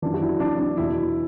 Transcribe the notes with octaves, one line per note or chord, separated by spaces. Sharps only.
F#2 E3 D4
F#4
E4
D4
D4
E2 B2 E4